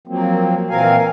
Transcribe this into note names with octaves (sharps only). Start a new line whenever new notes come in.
F3 F#3 A#3 C4
A#2 E3 C4 A#4 F5 G#5